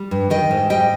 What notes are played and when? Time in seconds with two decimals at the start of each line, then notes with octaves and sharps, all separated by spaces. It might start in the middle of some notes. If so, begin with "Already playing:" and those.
Already playing: G3
0.11 G2
0.30 D#3 D#5 G5
0.51 G#2
0.70 G3 D#5 G5